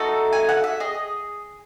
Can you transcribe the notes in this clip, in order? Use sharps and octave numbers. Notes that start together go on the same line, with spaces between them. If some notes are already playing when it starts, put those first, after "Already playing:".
Already playing: A3 D#4 F#4 A4
G#5
F#5
E5
G#4 D#5